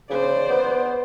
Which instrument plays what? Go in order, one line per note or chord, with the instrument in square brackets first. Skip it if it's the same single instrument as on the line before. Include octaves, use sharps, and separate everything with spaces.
[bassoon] C#3 [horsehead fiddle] C5 D5
[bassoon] B3